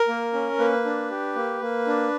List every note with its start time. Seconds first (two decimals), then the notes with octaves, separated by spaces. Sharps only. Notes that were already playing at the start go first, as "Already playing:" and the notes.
Already playing: A#4
0.08 A#3
0.33 C#4
0.59 A#3 B4
0.85 D4
1.10 G4
1.36 A#3
1.61 A#3
1.87 D4